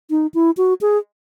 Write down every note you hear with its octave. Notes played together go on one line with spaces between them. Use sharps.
D#4
E4
F#4
G#4